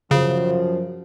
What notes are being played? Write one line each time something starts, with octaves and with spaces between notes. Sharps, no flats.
F#2 C#3 F3